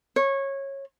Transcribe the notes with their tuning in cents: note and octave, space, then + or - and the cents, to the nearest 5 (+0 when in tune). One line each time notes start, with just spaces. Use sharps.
C#5 -20